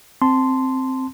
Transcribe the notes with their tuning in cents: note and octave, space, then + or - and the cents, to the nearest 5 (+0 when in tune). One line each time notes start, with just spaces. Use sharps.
C4 +0 A5 +0 C6 -10